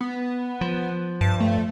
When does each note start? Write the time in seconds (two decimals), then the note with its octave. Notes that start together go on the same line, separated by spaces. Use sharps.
0.01 B3
0.61 F3
1.21 G2 A5
1.40 A3